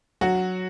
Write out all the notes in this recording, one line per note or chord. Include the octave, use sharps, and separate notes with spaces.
F#3 F#4